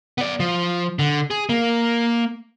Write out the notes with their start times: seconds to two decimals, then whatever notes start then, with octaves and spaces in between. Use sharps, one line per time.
0.18 B3 D5
0.40 F3
0.99 D3
1.31 G#4
1.49 A#3